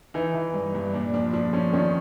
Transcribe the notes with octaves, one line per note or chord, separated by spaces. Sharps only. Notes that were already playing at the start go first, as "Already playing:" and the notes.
E3 D#4
E3
G2
G2
A#2 D4
F3 D4
F3 D4
F3 C#4
D#3 C#4